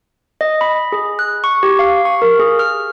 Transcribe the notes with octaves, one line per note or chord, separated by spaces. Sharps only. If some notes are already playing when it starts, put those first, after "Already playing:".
D#5
B5
G#4
F#6
C#6
G4
F5
C#6
A#4
G#4
F6